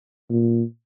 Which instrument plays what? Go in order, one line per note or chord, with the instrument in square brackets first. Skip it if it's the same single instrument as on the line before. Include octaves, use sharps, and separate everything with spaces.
[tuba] A#2